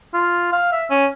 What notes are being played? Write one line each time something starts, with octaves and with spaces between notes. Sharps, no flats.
F4
F5
E5
C#4